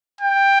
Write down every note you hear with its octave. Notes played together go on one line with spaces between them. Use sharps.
G5